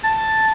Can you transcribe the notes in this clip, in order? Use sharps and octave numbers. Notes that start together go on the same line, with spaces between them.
A5